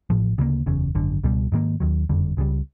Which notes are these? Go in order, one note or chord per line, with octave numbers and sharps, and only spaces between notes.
A1 A2 F3
D2 C#3 F#3 A#3
F#1 E2 C#3
G#1 F#2 D3
C#2 B2 G3
G#2 D#3 G3 A#3
D#2 D#3 F#3
F#1 F2 D3 G3
C#2 C#3 E3 G3